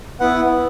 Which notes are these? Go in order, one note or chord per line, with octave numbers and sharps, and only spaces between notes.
B3 E4 B4 F#5